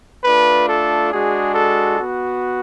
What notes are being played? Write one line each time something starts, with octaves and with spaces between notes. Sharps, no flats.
A3 D4 F4 B4
A4
G#3 D4 F#4 G#4
A4
B3 F#4